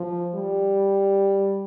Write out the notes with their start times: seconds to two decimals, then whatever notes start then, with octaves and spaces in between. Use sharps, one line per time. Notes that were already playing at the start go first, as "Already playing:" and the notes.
Already playing: F3
0.35 G3